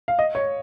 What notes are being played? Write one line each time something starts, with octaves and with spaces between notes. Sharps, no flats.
F5
D#5
C#5